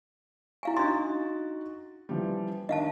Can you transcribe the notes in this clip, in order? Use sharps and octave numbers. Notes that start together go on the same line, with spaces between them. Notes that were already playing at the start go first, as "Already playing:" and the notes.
E4 F5 G#5
D4 D#4 F#4 C6 A6
E3 F3 G3
D#3 D4 D#5 F5 A5